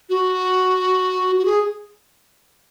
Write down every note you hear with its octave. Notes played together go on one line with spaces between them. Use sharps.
F#4
F#4
G#4